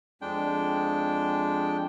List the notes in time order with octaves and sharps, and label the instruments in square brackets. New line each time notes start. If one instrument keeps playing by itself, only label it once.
[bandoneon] F2 G#3 D4 G5